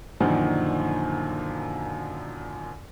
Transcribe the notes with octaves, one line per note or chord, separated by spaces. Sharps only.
F#2 A#2 D3 D#3 F3